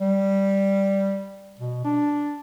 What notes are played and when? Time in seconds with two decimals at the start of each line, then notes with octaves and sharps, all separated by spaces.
0.01 G3
1.59 B2
1.84 D4